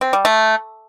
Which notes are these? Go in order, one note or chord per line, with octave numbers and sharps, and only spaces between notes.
C4
G3
A3